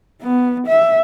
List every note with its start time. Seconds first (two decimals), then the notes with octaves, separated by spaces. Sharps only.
0.22 B3
0.67 E5